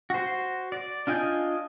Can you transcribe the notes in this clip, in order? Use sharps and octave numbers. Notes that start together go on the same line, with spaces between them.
F#4 C5
D5
D4 F4 D#5 G#5 G6